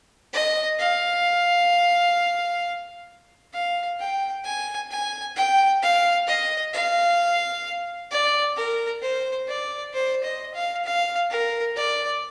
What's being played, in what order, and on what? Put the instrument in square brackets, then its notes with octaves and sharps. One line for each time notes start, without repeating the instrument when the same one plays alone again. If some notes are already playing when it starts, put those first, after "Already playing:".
[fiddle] D#5
F5
F5
G5
G#5
G#5
G5
F5
D#5
F5
D5
A#4
C5
D5
C5
D#5
F5
F5
A#4
D5